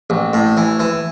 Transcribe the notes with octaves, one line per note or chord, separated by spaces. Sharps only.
A1
A2
E3
E3